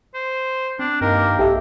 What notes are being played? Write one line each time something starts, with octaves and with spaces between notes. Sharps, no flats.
C5
C4 D4
G2 D#3 A#3 G4 A#4
A#1 G4 A4 E5